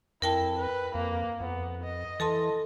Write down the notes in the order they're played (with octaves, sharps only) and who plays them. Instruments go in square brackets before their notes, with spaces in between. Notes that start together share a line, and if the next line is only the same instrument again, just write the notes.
[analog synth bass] F2 [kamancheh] E4 [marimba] A#4 G5 A5
[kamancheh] B4
[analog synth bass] F2 [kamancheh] A#3
[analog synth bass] F2 [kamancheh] B3
[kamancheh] D#5
[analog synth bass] E3 [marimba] A4 A5 C6